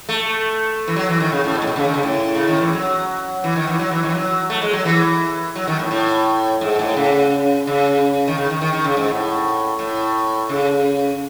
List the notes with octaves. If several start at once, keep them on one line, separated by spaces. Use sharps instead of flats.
A3
E3
F#3
E3
D#3
C#3
A2
B2
A2
B2
C#3
D#3
C#3
A2
C#3
D#3
E3
F#3
E3
D#3
E3
F#3
E3
D#3
E3
F#3
A3
G#3
F#3
E3
F#3
D#3
A2
A2
G#2
A2
C#3
C#3
D#3
C#3
D#3
D#3
D#3
C#3
G#2
A2
A2
C#3